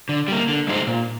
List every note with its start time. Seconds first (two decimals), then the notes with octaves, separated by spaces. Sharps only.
0.09 D3
0.28 G3 A#3
0.48 D3
0.68 G#3 D#4 G4 C5
0.87 A#2